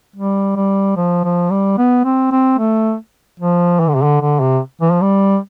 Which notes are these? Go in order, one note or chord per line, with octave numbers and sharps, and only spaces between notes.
G3
G3
F3
F3
G3
B3
C4
C4
A3
F3
E3
D3
C3
D3
D3
C3
E3
F3
G3